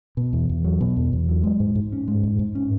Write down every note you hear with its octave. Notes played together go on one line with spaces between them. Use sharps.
B2
E2
E2
F#3
B2
E2
E2
F#3
G#3
G#2
G#2
C#4
G#3
G#2
G#2
C#4